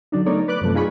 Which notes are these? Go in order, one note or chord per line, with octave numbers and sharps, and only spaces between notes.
D3 F#3 D4 D#4
A3 B3 D#4 A#4 C#5 D5
B4 D5 D6 F#6
F#2 C3 F3 A3
D#4 F4 G#4 B5 C#6